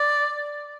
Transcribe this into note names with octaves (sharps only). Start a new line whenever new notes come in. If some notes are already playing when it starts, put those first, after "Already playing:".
Already playing: D5